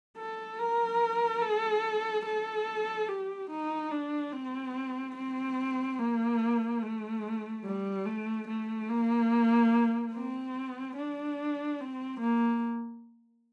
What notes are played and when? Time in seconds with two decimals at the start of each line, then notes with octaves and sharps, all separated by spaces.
0.18 A4
0.59 A#4
1.42 A4
2.26 A4
3.08 G4
3.50 D#4
3.91 D4
4.32 C4
5.16 C4
5.99 A#3
6.82 A3
7.64 G3
8.06 A3
8.48 A3
8.90 A#3
10.14 C4
10.97 D4
11.80 C4
12.21 A#3